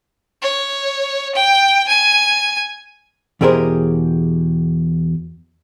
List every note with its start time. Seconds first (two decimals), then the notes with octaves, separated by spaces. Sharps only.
0.42 C#5
1.35 G5
1.88 G#5
3.41 E2 B2 G4 G#4 A#4 C5